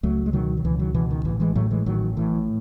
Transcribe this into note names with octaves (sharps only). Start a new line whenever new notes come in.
C#2 F#3 A3
G#3
B2 D#3 F#3
D#3
C#2 E3
D#3 F#3
B2 E3
D#3
A1 E3
E3 G#3
A2 F#3 A3
E3 G#3
A1 D#3 F#3
A2 E3